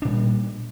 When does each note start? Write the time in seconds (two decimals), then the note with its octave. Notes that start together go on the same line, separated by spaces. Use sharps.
0.02 D4
0.05 A#2
0.08 G3